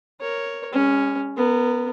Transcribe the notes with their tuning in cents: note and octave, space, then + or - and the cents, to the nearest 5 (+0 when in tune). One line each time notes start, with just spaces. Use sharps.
A#4 +0 C#5 +0
G#3 -45 C#4 +0
B3 +0 A#4 -30